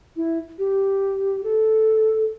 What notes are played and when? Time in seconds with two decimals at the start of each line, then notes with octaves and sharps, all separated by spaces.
0.16 E4
0.58 G4
1.44 A4